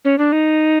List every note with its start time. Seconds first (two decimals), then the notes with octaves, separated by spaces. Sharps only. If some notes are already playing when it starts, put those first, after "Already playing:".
0.05 C#4
0.18 D4
0.32 D#4